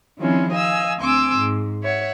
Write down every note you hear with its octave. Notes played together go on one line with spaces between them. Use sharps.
D#3 F3 G3 C4 C#4 E4
D#5 F5 G#5 E6
D2 C4 G#5 C6 D6 E6
G#2
C#5 E5 F#5